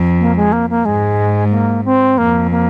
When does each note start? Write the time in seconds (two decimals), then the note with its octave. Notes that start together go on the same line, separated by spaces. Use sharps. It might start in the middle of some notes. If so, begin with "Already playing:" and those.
Already playing: F2
0.20 A#3
0.36 G#3
0.52 A#3
0.70 A#3
0.85 G#2 G#3
1.51 A#3
1.85 C4
2.18 F2 A#3
2.51 A#3